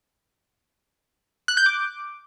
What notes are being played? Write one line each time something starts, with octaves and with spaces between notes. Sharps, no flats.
F#6
G6
D6